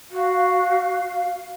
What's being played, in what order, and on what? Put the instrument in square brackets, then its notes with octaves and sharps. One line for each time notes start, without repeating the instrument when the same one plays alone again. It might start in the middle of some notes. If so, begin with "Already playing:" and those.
[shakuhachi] F#4 [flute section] F5